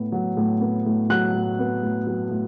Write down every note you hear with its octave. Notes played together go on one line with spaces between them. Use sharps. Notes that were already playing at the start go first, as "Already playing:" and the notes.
Already playing: A2 B3
F#3
A2
B3
A2
F#3 F#6
A2
B3
A2
F#3
A2